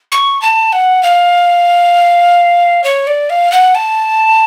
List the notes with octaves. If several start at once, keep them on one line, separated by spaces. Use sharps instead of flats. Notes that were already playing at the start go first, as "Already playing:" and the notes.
C#6
A5
F#5
F5
C#5
D5
F5
F#5
A5